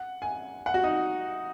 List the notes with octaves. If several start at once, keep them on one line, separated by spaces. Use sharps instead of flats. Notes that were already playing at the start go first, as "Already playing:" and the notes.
Already playing: F#5
G#5
F#5
F#4
D#4